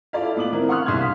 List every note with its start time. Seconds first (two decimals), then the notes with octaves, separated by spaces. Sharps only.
0.13 E4 F4 A4 D5 F5
0.36 A2 B3 D6 F#7
0.53 E3 C4 A#4
0.69 F#5 C6 C#6 D#6 F6 F#6
0.86 C2 C6 F6 G#6
0.99 F5 B6